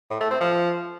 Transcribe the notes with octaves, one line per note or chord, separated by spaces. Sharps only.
A2
A3
C4
F3